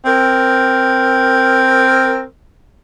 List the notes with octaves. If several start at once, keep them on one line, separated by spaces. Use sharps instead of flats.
C4 A#4